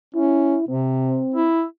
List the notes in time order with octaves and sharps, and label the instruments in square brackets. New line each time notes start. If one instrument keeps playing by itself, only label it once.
[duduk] C#4 [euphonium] E4
[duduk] C3 [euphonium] C4
[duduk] E4